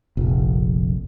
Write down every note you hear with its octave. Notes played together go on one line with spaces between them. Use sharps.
F1 A#1